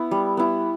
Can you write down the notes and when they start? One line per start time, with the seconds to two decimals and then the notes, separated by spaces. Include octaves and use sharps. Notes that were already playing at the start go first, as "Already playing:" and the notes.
Already playing: B3 E4
0.11 G3
0.37 B3 E4